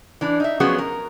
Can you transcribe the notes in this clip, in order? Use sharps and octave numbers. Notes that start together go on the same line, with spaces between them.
E3 D4
D#4 E5
F3 F#3 B3 C#4 F#4 G#4
A#4